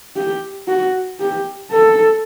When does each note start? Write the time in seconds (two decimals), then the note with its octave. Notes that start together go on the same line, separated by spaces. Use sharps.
0.16 G4
0.68 F#4
1.20 G4
1.72 A4